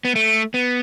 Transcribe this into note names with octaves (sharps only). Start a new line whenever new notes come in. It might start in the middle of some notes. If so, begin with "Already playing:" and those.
B3
A3
B3